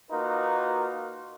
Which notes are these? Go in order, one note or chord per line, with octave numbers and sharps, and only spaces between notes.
A#3 D#4 F4 F#4 A#4 B4